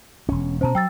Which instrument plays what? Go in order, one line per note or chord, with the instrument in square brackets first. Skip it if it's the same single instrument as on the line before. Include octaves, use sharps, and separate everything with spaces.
[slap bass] E1 C#4
[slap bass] B2 C#4 [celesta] C5 A5 A#5
[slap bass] F#3 [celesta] G5 E6 A6